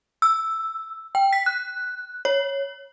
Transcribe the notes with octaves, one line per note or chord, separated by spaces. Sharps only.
E6
G5
B6
F#6
C#5